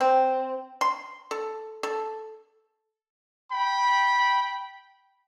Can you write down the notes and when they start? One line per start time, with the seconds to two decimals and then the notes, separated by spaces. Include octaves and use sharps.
0.01 C4
0.81 C6
1.31 A4
1.83 A4
3.52 G5 B5